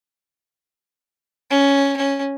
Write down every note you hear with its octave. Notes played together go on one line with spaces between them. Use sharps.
C#4
C#4